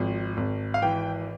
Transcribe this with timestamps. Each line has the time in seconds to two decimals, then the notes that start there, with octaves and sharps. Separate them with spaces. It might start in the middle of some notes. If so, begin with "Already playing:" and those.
Already playing: G#1 F3
0.37 G#1
0.74 F5
0.82 E3 G5